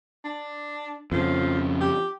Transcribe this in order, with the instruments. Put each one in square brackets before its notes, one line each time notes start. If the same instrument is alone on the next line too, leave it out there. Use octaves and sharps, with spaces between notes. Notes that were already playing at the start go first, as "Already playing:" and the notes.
[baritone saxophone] D4
[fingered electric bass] F2 C#3 [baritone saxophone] F3
[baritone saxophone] G4